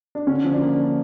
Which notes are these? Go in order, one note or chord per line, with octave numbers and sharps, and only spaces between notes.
D4
D3 C#4
F3
D4
A#3